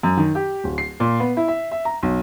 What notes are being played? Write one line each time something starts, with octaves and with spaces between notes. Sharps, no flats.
F#2
D#3
G4
D1
C7
A#2
B3
E4
E5
E5
A#5
B1